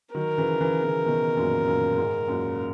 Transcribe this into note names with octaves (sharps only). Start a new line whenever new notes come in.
D#3 F#3 A#4
C#3 E3
C#3 E3
C#3 E3
B2 D#3
F#2 A#2
F#2 A#2
G#2
F#2 A#2